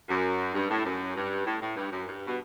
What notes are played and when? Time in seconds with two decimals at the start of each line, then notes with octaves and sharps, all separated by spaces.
0.09 F#2
0.55 G2
0.70 A2
0.85 F#2
1.16 G2
1.46 A2
1.61 A2
1.76 G2
1.92 F#2
2.07 G2
2.26 B2